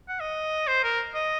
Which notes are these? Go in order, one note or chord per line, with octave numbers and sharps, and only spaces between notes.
F#5
D#5
C5
A#4
D#5